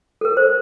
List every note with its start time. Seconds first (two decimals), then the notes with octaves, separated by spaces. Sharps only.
0.21 A4
0.25 A#4
0.37 C5